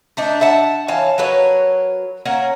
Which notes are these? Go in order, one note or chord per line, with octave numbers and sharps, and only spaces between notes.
A3 D4 D#4
E5 F#5 A5
E3 C#5 F5 A5
F#3 A#4 B4 C#5
A#3 C#4 A#4 F#5